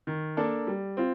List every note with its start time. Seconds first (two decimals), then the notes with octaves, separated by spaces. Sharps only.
0.07 D#3
0.37 A#3 D4 A4
0.67 G3
0.97 C4 F4